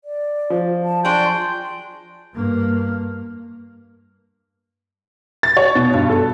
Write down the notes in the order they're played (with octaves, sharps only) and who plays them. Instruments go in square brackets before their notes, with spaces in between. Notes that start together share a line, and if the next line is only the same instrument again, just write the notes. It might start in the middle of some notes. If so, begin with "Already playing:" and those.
[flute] D5
[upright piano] F3
[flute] A5
[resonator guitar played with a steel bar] F#3 D4 G#4 [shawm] G5 [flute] C6
[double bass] G2 A#3
[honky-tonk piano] A6
C#5
B2
G2
A4